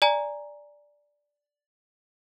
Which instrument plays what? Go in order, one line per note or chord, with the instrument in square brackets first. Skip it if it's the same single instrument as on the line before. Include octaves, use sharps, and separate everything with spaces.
[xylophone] D5 G#5 A#5